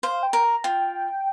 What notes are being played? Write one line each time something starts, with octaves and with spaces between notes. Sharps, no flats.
C5 F5
G5
A#4
A#5
F4 G5